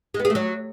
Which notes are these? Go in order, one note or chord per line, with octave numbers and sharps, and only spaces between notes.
G#3
B3
G#4
A3
F#3